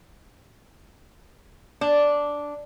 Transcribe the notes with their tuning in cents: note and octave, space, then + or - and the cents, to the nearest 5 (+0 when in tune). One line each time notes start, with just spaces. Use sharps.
D4 -5